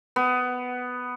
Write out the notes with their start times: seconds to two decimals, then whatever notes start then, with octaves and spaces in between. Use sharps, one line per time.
0.16 B3